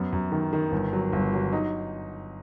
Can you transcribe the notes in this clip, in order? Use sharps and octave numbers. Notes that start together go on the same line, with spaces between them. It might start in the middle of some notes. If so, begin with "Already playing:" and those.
Already playing: F#2 B3
F#2
D#3
D#3
G1
F#3
G1
F#3
D#4